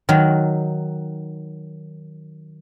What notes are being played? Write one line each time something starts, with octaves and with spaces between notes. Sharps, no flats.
D#3 F#3